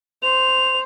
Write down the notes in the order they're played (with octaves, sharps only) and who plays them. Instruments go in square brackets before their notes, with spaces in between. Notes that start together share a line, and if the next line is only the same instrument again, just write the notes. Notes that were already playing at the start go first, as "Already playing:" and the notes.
[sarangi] C5 [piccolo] F7